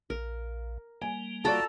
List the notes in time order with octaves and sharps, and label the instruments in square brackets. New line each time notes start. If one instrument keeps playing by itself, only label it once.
[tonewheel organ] A#1 [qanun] A#4
[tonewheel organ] G3 A#3 [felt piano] G#5
[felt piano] F4 F#4 D5 [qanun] A4 A#5 [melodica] A5